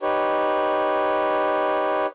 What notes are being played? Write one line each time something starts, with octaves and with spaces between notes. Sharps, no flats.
D#4 G4 B4 C#5